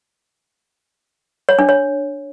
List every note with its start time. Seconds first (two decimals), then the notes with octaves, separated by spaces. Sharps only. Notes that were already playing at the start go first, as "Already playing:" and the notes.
1.49 C#5
1.59 D4
1.69 C#5